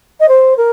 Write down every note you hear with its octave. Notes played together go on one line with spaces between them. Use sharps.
D#5
C5
A#4